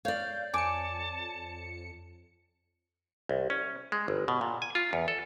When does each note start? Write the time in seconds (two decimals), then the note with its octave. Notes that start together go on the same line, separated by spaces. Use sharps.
0.05 C#5 D5 F5 G6
0.53 F2 G#5 A5 D6 C#7
3.29 C2
3.50 C#4
3.92 G#3
4.08 G1
4.28 B2
4.41 A#2
4.62 G#5
4.75 F4
4.93 E2
5.08 A4